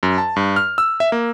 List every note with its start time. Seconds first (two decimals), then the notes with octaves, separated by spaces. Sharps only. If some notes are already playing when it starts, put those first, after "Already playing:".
0.03 F#2
0.18 A5
0.36 G2
0.56 F6
0.78 E6
1.00 E5
1.12 A#3